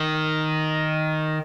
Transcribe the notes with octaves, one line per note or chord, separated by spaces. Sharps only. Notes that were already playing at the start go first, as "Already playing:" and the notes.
Already playing: D#3